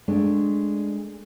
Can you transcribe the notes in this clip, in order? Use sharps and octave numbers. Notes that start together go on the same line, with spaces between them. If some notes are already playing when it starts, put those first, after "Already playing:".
G#3 A3 D4